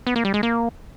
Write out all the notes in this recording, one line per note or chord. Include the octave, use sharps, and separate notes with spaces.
B3
A#3
G3
G#3
A#3